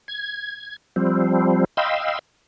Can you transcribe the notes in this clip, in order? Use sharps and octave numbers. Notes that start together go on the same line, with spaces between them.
G#6
F3 G3 C4
D#5 F5 G5 B5 C6 E6